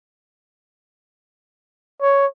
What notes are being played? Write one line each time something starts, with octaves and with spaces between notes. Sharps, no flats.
C#5